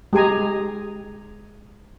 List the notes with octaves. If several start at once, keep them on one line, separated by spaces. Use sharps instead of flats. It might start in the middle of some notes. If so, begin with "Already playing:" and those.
G#3 G4 G#4 G#5 A#5